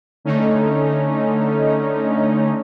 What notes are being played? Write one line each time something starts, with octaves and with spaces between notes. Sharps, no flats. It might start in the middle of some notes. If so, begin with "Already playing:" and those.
D3 A3 C#4 D#4